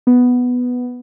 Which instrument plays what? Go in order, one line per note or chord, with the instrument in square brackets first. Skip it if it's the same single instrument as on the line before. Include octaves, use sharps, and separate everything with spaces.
[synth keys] B3